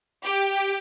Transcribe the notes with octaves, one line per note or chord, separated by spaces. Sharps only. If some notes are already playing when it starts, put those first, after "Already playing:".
G4